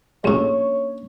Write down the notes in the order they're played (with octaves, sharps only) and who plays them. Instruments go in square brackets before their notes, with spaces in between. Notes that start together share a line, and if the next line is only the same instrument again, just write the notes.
[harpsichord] A#1 A2 [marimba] A#3 C#4 D4 [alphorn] C#5